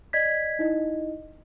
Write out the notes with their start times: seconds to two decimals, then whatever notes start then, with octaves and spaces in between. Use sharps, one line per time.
0.13 D5 D#5 G#6 B6
0.59 D#4 E4 D#5